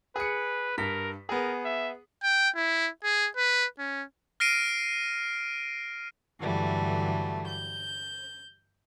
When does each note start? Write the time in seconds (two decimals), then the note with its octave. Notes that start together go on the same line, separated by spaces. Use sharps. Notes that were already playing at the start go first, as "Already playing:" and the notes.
0.16 G#4 B4 C#7
0.78 G2 A#4 B6
1.29 B3 G#4 A#4
1.65 E5
2.23 G5
2.56 E4
3.04 G#4
3.37 B4
3.79 C#4
4.40 F6 A#6 C7 D7 D#7
6.39 G2 D3 E3 F#3 G3 A3
7.48 G6